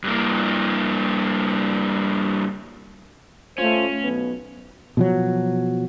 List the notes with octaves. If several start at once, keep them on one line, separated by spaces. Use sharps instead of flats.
G2 A#3
A3 C#4 F4 C5
B1 B2 B3
B2 F3 F#3